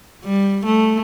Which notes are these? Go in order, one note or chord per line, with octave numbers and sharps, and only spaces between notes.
G3
A3